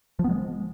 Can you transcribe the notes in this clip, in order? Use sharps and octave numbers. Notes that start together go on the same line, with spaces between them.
F3
B3
G#3